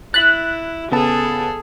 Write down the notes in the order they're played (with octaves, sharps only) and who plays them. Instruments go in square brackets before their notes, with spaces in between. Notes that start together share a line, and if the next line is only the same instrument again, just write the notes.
[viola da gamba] E4 [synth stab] F#6 [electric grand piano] A6 B6
[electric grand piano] C#3 B3 A5 [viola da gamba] G#4 A4